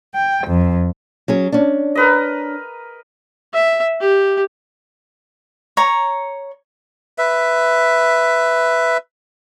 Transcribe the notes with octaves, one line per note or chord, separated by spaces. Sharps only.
G5
F2
F#3 C#4 G#4
C#4 D4
A#4 B4 D#5
E5
G4
C#5 A#5
B4 E5